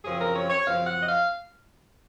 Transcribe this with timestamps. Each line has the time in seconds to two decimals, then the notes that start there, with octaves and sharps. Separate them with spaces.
0.04 F#2 C#3 F3 C4 G#4
0.19 A#4
0.35 C#5
0.50 C#5
0.66 F#2 C#3 F3 C4 F5
0.86 F#5
1.00 D#5
1.07 F5